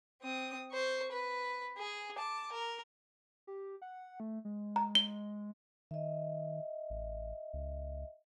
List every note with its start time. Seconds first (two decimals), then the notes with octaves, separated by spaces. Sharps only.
0.22 C4 D#6
0.72 C5 C#6
1.12 B4
1.77 G#4
2.17 A5 D6
2.52 A#4
3.47 G4
3.82 F#5
4.20 A3
4.45 G#3
4.76 A#5
4.95 G7
5.91 D#3 D#5 E5
6.90 A1
7.54 C#2